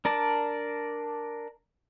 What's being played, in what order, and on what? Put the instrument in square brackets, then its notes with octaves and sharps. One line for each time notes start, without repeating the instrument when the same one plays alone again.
[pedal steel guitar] D4 A#4 D5 A5